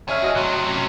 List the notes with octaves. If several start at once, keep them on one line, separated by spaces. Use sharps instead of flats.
D4 G#4 C#5 E5 F6
F#4 D#5
A2 C3 F#3
F#3 C#4